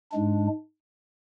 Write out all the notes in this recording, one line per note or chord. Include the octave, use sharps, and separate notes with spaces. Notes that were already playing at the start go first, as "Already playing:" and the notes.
G#2 G#3 D4